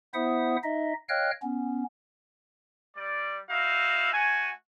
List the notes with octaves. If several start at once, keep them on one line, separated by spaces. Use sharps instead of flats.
B3 E4 C5 E5 F#5 D#6
D#4 D#5 E5
C#5 D#5 F5 G5 F6 F#6
B3 C#4
G3 D5
D#4 E4 F#4 E5 F5
A3 F#4 G#5